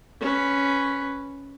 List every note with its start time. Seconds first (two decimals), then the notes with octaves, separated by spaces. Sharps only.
0.20 C#4 B4